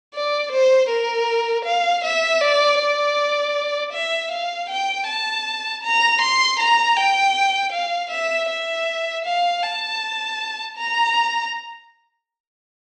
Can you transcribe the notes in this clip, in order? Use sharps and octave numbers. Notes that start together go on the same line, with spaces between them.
D5
C5
A#4
F5
E5
D5
D5
E5
F5
G5
A5
A#5
C6
A#5
G5
F5
E5
E5
F5
A5
A#5